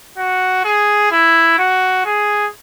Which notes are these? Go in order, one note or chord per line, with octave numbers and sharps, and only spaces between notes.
F#4
G#4
E4
F#4
G#4